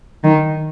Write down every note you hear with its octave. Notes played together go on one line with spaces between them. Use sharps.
D#3